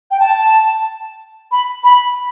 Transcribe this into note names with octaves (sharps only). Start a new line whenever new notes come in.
G5
A5
B5
B5